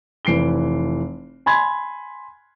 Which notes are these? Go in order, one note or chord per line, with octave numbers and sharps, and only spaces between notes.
F1 E3 C7 D7 G7
G#5 B5 C6 G#6